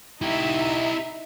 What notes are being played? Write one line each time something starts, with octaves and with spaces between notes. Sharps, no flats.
D#4 E4 G4 E5